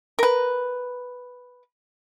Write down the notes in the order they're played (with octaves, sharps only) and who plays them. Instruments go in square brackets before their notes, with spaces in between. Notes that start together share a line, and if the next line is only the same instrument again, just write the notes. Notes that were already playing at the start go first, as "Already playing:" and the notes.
[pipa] A#4 B4